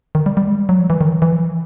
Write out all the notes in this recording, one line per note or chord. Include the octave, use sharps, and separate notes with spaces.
D#3
G3
G3
G#3
G3
F#3
F3
E3
D#3
E3
E3
F3